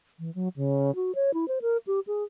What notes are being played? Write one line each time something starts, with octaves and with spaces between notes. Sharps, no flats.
E3
F#3
C#3
F#4
C#5
E4
C5
A#4
G4
G#4